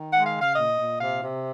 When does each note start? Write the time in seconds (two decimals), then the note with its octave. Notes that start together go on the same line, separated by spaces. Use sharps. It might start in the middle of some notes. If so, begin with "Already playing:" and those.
Already playing: D#3
0.12 G#3 F#5
0.26 F5
0.34 C#3
0.42 F5
0.56 A#2 D#5
0.78 A#2
1.00 C3 F5
1.22 C3